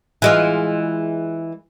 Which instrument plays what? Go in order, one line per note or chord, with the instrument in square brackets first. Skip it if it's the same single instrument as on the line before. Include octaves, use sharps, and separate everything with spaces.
[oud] E3 G#3 F4